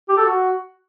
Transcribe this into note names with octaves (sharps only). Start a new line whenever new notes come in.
G4
A4
F#4